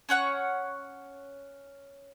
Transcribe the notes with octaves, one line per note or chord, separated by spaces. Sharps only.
C#4 C#5 F#5 C#6